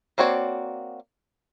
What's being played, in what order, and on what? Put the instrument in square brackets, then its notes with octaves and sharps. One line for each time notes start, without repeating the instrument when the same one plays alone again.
[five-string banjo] A#3 C4 F#4 C#5 D5